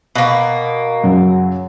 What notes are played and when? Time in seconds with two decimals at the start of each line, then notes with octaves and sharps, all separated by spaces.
0.16 B2 A#3
1.04 F#2 C#3 F#3